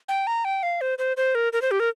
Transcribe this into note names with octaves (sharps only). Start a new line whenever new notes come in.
G5
A#5
G5
F5
C5
C5
C5
A#4
A#4
C5
G4
A#4